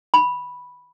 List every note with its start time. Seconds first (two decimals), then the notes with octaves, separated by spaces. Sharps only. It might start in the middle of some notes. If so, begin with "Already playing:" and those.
0.14 B5